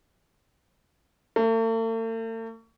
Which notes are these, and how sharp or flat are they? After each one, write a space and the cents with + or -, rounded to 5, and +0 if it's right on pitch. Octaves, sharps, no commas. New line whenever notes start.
A3 +45